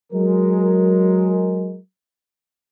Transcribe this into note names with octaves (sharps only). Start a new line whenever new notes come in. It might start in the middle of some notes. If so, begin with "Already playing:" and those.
F#3 G#3 A#4